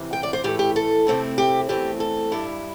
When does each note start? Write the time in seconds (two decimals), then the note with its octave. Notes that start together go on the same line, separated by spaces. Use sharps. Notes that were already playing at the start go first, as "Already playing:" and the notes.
Already playing: C3 E3
0.13 G5
0.23 D5
0.33 C5
0.44 A2 E3 A3 G4
0.59 G4
0.76 A4
1.07 C3 A3 C4 E4
1.38 G4
1.69 E2 E3 A3 C4 G4
2.00 A4
2.32 G2 G3 E4